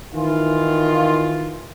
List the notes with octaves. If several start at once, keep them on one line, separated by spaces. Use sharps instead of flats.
D#3 E3 F4